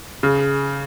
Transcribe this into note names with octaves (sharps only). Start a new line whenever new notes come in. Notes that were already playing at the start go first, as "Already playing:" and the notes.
C#3